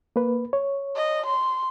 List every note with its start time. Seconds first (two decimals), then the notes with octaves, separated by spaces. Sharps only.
0.16 A#3 B4
0.53 C#5
0.96 D#5
1.26 C6